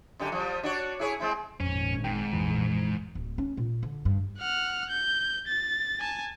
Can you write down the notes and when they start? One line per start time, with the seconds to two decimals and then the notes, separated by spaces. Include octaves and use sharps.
0.19 F#2 D3 G4
0.32 F3 G3
0.63 D4 F#4 C#5
0.99 E4 G#4 C#5
1.20 G#3 C4 E4
1.60 G#1 F2 A#2 C#4
2.04 G#2 G5
2.33 A#1 F2 E3
3.15 D1
3.38 C#4
3.57 A#2
3.83 D3
4.05 G2
4.39 F#5 F6
4.90 G6
5.47 A6
6.00 G#5 A5